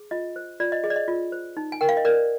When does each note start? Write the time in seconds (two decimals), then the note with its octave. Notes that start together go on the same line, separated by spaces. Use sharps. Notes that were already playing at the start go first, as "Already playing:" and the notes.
Already playing: G#4
0.11 F4 D#5
0.36 C5
0.60 F4 D5
0.72 D#5
0.84 G#4 D#5
0.90 D5
0.96 D#5
1.08 F4
1.32 C5
1.57 D#4
1.72 G#5
1.81 A#4 G5
1.89 F5
1.97 D#5
2.05 A#4 D5